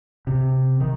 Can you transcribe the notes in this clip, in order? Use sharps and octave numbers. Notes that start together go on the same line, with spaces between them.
C3
D#3